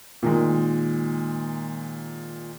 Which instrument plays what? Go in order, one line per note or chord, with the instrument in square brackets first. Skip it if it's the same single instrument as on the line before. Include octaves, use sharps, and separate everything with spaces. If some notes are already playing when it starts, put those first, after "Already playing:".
[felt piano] A#2 D#3 G#3